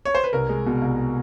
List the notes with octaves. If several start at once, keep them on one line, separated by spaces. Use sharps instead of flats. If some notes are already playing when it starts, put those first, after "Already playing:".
C#5
C5
B4
C2 A#4
G#3
B2
C2